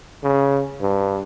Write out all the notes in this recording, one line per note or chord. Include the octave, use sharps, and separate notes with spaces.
C#3
G2